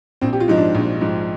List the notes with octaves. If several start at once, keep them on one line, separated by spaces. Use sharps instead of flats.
A#1 C4
G4
F4
G#2 F3 D#4
D4
A#1
G#2 F3